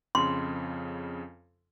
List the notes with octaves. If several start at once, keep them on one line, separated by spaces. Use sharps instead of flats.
F2 C#3 C6